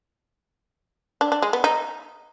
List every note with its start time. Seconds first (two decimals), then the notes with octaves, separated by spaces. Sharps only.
1.21 D4
1.32 D4
1.42 G#3
1.53 B3
1.64 D#4